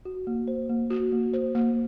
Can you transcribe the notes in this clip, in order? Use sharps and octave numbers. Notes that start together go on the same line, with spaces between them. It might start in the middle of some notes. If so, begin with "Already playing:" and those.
F#4
A#3
C5
A#3
F#4
A#3
C5
A#3